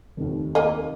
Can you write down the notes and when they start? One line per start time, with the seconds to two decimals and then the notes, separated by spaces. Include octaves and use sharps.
0.17 F1 D#2
0.55 A#3 D#5